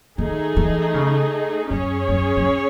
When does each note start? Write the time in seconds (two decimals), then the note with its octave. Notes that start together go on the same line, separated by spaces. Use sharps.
0.18 D#3 A3 D#4 G#4
0.56 E3
0.94 C#3
1.70 F#2 C#4 G#4 C#5
2.08 F#2
2.36 F#2